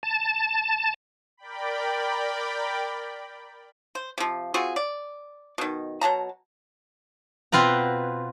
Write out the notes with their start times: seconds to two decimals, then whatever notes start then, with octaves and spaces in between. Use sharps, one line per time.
0.03 A5
1.37 A#4 D5 G5 B5
3.95 C5
4.18 C3 F3
4.54 C4 F4 F#4 G#4
4.76 D5
5.58 B2 D#3
6.01 B2 F#3 A5 A#5
7.52 B2 C4 F4 B4 A#5